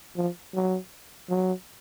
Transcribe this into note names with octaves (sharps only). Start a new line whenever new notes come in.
F3
F#3
F#3